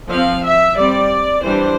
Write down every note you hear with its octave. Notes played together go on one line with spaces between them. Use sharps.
F3 C4 F5
E5
G3 C4 D5
E3 G3 D4 C5